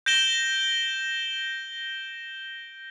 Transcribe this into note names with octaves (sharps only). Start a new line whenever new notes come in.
G6 A#6 D7 E7 G7